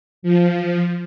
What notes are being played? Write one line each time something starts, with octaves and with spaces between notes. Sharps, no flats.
F3